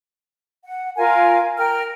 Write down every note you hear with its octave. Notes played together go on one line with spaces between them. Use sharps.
F#5
F4 A#4 F5 G#5
A#4 G5 F6